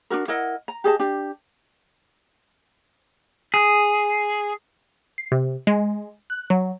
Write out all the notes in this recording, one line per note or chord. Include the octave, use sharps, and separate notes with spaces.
D4 D#4 F#4 A#4
E4 A#4 D#5 F#5
A#5
G4 G#4 D#5 A5
D4 G4
G#4
C7
C3
G#3
F#6
F#3